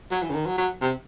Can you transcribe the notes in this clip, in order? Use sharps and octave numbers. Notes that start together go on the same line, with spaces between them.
F#3
E3
C#3
D#3
F#3
F#3
C3